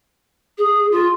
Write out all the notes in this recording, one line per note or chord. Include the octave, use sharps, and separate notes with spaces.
G#4
F4